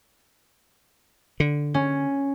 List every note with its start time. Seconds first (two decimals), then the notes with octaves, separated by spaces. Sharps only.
1.40 D3
1.74 C#4